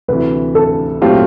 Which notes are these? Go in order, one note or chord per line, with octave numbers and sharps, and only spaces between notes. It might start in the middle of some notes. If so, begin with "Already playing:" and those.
D2 C3 E3 B4
A4
A#2 F#3 A3 C4 F4 G4